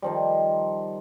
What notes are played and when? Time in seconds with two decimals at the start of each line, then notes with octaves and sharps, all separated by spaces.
0.02 D#3 F3 G3